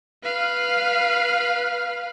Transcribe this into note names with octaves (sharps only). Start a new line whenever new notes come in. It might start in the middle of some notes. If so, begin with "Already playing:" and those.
B4 F5